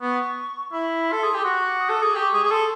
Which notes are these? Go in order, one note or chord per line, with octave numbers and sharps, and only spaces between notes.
B3 C#6
E4 B5
A4 C6
G#4
G4
F#4 C#6
D6
D#6
A4
G#4 D6
G4 C#6
G#4
G#4
A4 C6